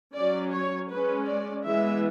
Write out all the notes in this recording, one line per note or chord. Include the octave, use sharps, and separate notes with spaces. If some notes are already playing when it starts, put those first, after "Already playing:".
F#3 C#4 D5
C#5
G#3 C#4 B4
D5
E3 G#3 B3 E5